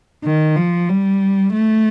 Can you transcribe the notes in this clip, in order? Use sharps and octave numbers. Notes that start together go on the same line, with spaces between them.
D#3
F3
G3
A3